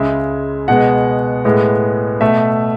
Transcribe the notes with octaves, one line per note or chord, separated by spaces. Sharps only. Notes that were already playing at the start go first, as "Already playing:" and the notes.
Already playing: C#2 C#3 G#3 E5
B2 G#3 B3 F#5
A2 G#3 B3
B2 A3 E5